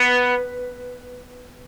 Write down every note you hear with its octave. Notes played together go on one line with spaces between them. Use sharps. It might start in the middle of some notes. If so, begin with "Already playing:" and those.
Already playing: B3